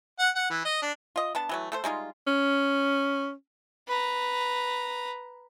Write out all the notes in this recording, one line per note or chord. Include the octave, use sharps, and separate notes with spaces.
F#5
F#5
E3
D#5
D4
F4 D#5
B3 D4 A5
E3 F#3 A3
A3 A4 C5
G3 G#3 D#4 F4
C#4
B4 A#5